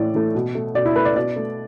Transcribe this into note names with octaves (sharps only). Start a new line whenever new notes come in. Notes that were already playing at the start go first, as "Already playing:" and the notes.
Already playing: A2 E3 A3 D5
E3 A3
B2
A3
B2 D5
E4
A3 B4
D5
B2 D5
A3